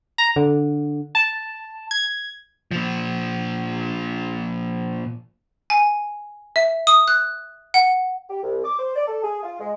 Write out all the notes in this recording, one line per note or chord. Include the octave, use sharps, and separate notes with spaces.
A#5
D3
A5
G#6
A#2 F3
G#5
E5
D#6
F#6
F#5
G4
C2
D6
C5
D5
A4
G#4
F4
G#3